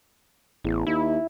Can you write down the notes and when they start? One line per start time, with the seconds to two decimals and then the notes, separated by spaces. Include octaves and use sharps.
0.64 A1 E2
0.87 D#2 E4